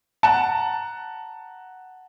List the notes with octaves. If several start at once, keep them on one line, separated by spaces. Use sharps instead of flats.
F#5 A5 A#5